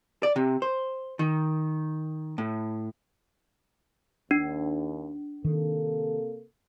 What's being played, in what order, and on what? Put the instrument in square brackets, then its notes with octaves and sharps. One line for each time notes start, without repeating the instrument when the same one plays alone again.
[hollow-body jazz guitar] D5
C3
C5
D#3
A2
[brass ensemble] D#2 [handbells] D4
[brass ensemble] C3 A#3 A4 [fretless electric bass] D#3